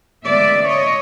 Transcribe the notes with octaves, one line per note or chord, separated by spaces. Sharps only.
D2 C#3 E3 G#3 B3 D5 E5
C#5 D#5